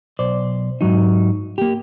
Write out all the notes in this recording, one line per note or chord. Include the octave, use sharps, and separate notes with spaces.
B1 C5 D5
G#2 F#3 D#4
A#3 G4